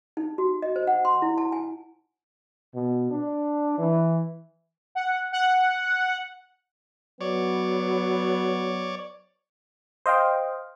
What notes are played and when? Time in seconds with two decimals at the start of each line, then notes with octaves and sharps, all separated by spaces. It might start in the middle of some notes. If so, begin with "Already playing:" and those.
0.17 D#4
0.38 F#4
0.62 D#5
0.76 C5
0.87 F#5
1.05 C6
1.22 E4
1.38 A5
1.52 G#5
2.74 B2
3.11 D4
3.78 E3
4.95 F#5
5.32 F#5
7.21 F#3 B3 C#5 D5
10.06 C5 D#5 F5 G5